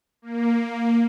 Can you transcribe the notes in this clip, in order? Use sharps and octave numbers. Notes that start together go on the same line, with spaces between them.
A#3